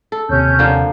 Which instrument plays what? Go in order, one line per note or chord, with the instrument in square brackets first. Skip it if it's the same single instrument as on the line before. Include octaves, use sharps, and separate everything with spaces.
[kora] A4
[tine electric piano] D#2 C3 [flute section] C#4 G6
[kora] D3 F3 A#3